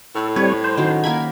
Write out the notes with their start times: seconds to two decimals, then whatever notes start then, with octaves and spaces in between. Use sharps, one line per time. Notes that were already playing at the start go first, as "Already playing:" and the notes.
0.15 A2 A4
0.36 G3 C4 B4 C#5
0.64 C5
0.77 D#3 F#3 C#4
1.04 A#3 A#4 B5 G#6